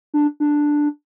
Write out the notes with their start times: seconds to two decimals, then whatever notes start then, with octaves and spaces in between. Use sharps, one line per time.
0.14 D4
0.40 D4